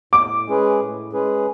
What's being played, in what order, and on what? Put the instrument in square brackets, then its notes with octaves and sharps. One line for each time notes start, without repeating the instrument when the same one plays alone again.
[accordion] A2 [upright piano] D6
[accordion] G#3 C#4 G#4 B4
A2
G#3 C#4 G#4 B4